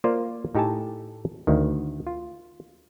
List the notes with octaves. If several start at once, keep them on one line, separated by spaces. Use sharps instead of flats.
A#3 F4 C5 D5 F5
A2 D#4 G4 A4 G#5 A5
D2 D#3
F4